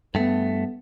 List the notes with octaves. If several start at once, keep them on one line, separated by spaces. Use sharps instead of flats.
G2 A3 B3